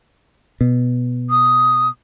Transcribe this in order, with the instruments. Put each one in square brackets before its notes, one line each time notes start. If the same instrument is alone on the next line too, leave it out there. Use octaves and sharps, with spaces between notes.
[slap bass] B2
[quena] D#6